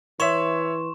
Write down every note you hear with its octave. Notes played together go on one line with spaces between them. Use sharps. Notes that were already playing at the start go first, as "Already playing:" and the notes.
E3 C#5 E5 C6 C#6 E7